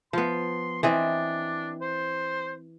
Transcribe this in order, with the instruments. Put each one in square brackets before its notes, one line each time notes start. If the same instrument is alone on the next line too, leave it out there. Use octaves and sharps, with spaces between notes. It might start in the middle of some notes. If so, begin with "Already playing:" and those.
[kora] F3 B3 [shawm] C6
[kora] E3 C4 D#5 [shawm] D4
[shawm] C5